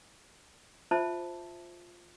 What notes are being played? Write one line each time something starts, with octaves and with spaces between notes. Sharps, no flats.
F4 C5 E5 A5